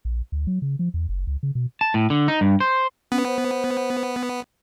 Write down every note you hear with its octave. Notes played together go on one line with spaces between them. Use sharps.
A#1
D2
F#3
C#3
F3
E2
F#1
C#2
C#3
B2
A5
A2
D3
D#4
G2
C5
B3 C#4
C5